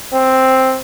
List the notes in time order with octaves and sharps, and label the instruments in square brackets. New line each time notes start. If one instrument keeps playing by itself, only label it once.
[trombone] C4